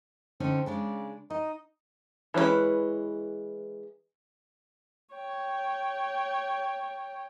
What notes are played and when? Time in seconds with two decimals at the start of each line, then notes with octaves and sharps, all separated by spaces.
0.40 D3 C4 C#4 D#4
0.66 C#3 G#3 D4 D5
1.30 D#4 D#5
2.34 E3 G#3 C#4 D4 B4
5.14 C#5 G5